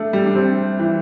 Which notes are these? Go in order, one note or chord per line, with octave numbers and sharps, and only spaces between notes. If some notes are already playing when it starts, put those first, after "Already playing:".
Already playing: A3 D4
G3
D4
C4
E3